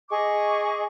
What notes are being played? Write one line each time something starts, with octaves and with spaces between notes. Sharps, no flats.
G#4 D#5 C#6 D6